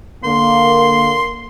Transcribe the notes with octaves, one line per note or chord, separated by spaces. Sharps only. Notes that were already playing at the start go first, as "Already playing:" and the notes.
D3 A#3 C6